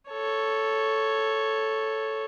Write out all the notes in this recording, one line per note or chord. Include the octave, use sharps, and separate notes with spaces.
A4 C#5